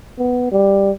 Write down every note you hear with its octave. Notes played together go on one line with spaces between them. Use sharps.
B3
G3